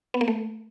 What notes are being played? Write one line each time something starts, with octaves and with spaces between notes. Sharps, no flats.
B3
A#3
A3